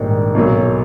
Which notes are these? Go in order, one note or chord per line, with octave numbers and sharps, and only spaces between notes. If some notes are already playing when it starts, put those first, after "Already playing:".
Already playing: A#1 G#2 D#3 G3
B1 A#2 F#3